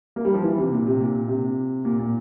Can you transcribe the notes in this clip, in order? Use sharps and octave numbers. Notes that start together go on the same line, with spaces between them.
A#3
G3
F3
E3
C3
A#2
C3
A#2
C3
A#2
A#2